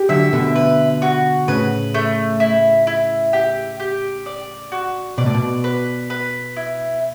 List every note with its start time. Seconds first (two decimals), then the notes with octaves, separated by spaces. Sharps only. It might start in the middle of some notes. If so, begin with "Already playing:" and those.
Already playing: G4
0.09 D3 F#3 E5
0.33 B2 D3
0.56 B4
1.02 F#4
1.48 A2 C#3 B4
1.94 A3
2.40 E4
2.87 E4
3.33 G4
3.80 G4
4.26 D5
4.72 F#4
5.18 B2 D5
5.26 A2
5.34 B2
5.64 B4
6.10 B4
6.56 E4